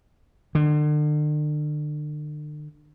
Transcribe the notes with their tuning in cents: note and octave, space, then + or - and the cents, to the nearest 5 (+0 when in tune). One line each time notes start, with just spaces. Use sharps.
D3 +40